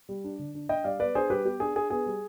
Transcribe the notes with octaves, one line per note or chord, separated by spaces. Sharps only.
G3
D4
D3
D4
D4 D#5 G5
G3 D5 F5
B3 B4 D5
D4 G#4 C5
G3 G4 B4
B3 G4
D4 G#4
D4 G#4
B3 G#4
G3